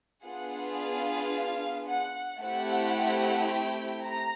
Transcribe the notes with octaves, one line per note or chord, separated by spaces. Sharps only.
B3 D4 F4 G#4 F#5
F5
F#5
A3 C4 E4 G4 F#5
G5
A#5